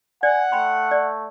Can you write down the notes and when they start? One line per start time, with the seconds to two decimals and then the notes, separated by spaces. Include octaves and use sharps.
0.23 D5 F#5 G#5
0.52 A3 G5 B5 C6
0.91 D5